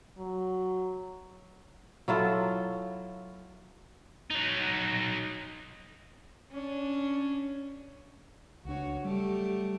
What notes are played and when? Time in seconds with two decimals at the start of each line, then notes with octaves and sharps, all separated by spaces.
0.18 F#3
2.08 F#3 E4 F4 A4
4.30 F#3 D#4
6.51 C#4 D4
8.65 C#2 D4 F#4 C#5
9.04 F#3 G3 A3 G4